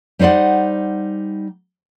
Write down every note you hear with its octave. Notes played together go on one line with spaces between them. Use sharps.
G3 D#4 C5 D5 F#5